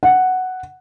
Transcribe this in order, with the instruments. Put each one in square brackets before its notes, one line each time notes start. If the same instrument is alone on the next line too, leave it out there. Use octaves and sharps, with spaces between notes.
[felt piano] F#5